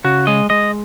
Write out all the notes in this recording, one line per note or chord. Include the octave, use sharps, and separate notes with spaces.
C#3 F#4
G#3 D#5
G#3 D#5